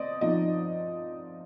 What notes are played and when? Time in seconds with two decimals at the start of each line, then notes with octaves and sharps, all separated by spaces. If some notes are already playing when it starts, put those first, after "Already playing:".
Already playing: C4 D5 D#5
0.21 F3 C4 D#4 D#5